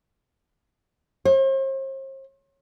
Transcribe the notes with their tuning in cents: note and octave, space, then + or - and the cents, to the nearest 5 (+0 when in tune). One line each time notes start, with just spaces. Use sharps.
C5 +45